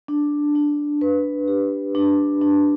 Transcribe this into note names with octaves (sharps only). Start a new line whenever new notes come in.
D4
D4
B4
G4
D4
D4